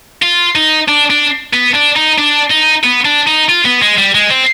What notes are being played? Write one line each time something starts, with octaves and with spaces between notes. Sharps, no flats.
F4
D#4
D4
D4
B3
D4
D#4
D4
D#4
B3
D4
D#4
F4
B3
G#3
G3
G#3
C4